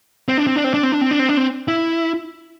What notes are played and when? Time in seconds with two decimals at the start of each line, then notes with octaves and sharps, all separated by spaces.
0.28 C4
0.38 D4
0.47 C4
0.56 D4
0.64 C4
0.74 D4
0.83 C4
0.92 D4
1.01 C4
1.11 D4
1.19 C4
1.29 D4
1.37 C4
1.68 E4